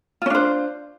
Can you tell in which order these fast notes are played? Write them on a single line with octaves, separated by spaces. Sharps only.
F4 C#4 D4 C5